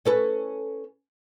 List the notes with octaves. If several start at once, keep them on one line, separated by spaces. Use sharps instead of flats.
C#4 A4 B4